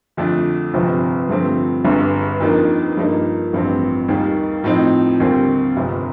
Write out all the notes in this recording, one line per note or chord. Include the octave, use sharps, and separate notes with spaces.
F2 D3 A3 D4
G1 F2 C3 F3 C4
G2 D3 F3 A3 C4
G1 G2 D3
F2 D#3 A#3 D4
G2 F3 A#3 D#4
A1 G2 F3 C4
D#2 D#3 G3
A2 F3 C4 D#4
D#2 D3 G3 C4
G1 F2 C3 F3